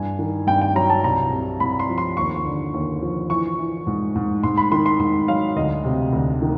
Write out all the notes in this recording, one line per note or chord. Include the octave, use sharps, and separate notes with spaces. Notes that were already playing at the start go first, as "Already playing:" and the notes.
Already playing: G2 E3 G#5
D#3
G2 G5
G5
F#3 A#5
A5
C2 A#5
C3
C2 B5
C6
F3
C6
D#2 C#6
D3
D#2
F3
E3 C#6
E3
G#2
G#2
G#2 C6
B5
D#3 C6
C6
G#2 C6
F#3 F5
D2 D#5
C3
D2
D#3